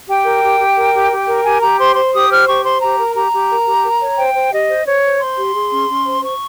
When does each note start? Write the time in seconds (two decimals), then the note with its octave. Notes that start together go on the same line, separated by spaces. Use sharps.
0.08 G4 G5
0.25 A#4
0.43 G4
0.59 G4
0.76 A#4
0.94 G4
1.11 G4
1.27 A#4
1.44 G4 G#5
1.61 G4 A#5
1.79 C5 C6
1.96 C5 C6
2.13 G4 D#6
2.30 C5 F6
2.47 G4 C#6
2.64 C5 C6
2.81 G4 A#5
2.99 A#4
3.15 G4 A#5
3.32 G4
3.49 A#4
3.66 G4
3.84 A#4
4.00 C#5
4.17 C5 G5
4.34 C5
4.52 G4 D#5
4.69 C5
4.85 C5 C#5
5.03 C5
5.19 C5 C6
5.37 G4
5.54 G#4
5.71 C#4
5.88 C#4
6.05 C5
6.22 C5 C#6